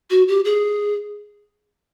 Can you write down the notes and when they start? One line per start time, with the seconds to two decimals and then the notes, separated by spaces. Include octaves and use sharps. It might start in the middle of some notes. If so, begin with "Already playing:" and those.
0.11 F#4
0.28 G4
0.45 G#4